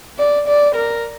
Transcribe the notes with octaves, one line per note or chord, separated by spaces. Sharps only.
D5
D5
A#4